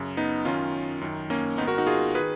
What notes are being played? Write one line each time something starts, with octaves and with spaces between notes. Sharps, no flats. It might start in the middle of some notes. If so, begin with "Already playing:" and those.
Already playing: F#2 C#3
B3 D#4
F#2 D#3 C#4 F4
F#2 D#3
A#3 C#4
G#2 D#3 B3 D#4
F#4 A#4
D#4 F#4
F4 G#4
D#3 G#4 B4